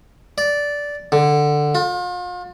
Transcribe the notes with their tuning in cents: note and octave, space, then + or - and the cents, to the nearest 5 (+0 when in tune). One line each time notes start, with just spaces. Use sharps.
D5 -10
D3 +10
F4 +40